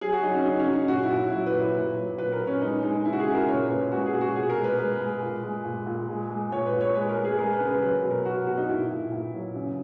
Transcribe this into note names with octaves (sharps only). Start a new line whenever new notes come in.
F#3 G#4
F#4
F#3 D#4
C#4
C#3 D#4
C#4
F#3
D#4
A#2 F#4
E4
A#2
E4
F#3 E4
B4
A#2
B4
A#2
F#3
A#2 B4
A#4
A#2
C#4
G#3 D#4
G#3 D#4
C#3 E4
F#4
G#4
C#3
A#4
A#2 C#5
A#2 B4
G#3 F#4
G#4
A#2
F#4
B2 G#4
A#4
G#3
B4
G#3 B4
G#3
A#2
G#3
A#2
A#2
G#3
G#3
A#2 C#5
B4
A#2
C#5
G#3 B4
A#4
G#3
G#4
G#3 A#4
B4
C#3
B4
F#3 B4
B2
A#4
B2 F#4
B2 F#4
D#4
A#2 E4
A#2
A#2
F#3
C#3